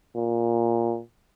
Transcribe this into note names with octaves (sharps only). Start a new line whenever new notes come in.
A#2